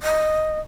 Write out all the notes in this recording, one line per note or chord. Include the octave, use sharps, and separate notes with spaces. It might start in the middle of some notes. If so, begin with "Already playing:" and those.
D#5